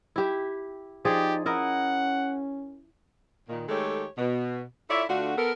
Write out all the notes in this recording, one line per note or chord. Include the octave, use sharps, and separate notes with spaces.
E4 G4 E5
F3 D#4 G4 G#4 D5
C#4 E4 A#4 D#5 F#5
A#2 D#3
D#3 G#3 A3 G4 A4 C#5
B2
E4 F4 A4 C#5 D5 E5
D3 A3 D4 F4 F#4
B3 A4 A#4